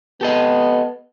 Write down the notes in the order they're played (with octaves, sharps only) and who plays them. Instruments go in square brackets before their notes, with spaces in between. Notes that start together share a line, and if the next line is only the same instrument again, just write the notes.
[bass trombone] B3 [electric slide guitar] G4 A4 D#5